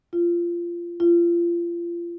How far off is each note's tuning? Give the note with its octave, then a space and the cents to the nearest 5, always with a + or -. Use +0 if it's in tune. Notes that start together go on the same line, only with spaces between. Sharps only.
F4 -20
F4 -30